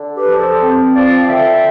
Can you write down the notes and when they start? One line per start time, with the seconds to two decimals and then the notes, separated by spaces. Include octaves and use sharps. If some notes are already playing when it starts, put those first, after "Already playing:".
Already playing: D3
0.16 G4 B4
0.27 F3
0.39 A4 C5
0.62 C4
0.94 F3 D5 F5
1.28 D3 E5 G5